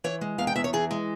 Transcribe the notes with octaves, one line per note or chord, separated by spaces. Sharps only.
E3 C#5
G#3
E2 F5
G5
E2 E5
C#5
E3 G#4
G#3